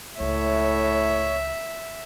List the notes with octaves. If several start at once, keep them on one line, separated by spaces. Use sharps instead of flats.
C#2 A2 C#5 E5